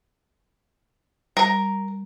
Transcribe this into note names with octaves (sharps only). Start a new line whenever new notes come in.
G3 A#4 A#5